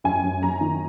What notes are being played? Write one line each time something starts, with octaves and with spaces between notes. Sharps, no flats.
F#2 G#5
F#2
F#2 A#5
D#3